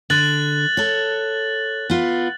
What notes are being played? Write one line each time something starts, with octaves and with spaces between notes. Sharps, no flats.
D3 F#6 A6 F#7
A4 C#5
B3 F4